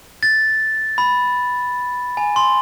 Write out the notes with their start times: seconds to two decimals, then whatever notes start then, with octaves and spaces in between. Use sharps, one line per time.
0.23 A6
0.98 B5
2.17 G#5
2.36 C6